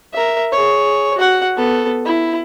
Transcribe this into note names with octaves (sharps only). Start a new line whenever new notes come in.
A#4 E5
G#4 C#5
F#4 F#5
B3 A4
E4